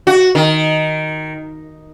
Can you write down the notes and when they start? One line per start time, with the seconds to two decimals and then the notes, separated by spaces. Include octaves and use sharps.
0.07 F#4
0.35 D#3